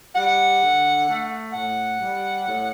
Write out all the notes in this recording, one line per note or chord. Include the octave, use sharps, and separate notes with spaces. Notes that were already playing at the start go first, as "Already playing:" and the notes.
G3 F#5
D3
A3
A2 F#5
G3
A2